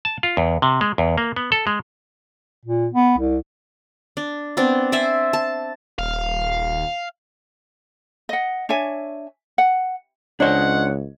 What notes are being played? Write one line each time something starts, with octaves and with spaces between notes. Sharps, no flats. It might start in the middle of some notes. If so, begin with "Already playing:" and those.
A5
F4
E2
C3
G#3
E2
A#3
B3
A4
G#3
A#2
B3
C2
D4
B3 C4 D4
C5 D5 E5 G#5
A5
D#1 F5
D#5 F#5
D4 C#5 E5 G#5
F#5
C#2 D4 C5 C#5 D#5 F#5